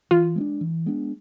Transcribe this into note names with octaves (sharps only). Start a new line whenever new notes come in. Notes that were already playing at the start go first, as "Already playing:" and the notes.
E3 F4
G#3 B3 D4
E3
G#3 B3 D4